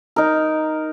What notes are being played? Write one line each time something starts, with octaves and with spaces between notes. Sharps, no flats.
D#4 A#4